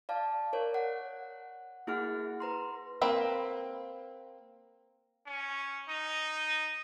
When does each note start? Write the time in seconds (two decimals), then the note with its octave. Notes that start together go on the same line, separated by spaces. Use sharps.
0.09 D5 F5 A5
0.53 A#4 C#5 D5
0.74 F#5
1.87 A#3 E4 F#4 G#4 F#5 F6
2.40 B4 A#5 C6
3.01 A#3 C4 B4
5.26 C#4
5.89 D#4